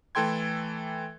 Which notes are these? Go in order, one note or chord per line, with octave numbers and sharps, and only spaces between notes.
E3 A3 A4 G5 C6 G#6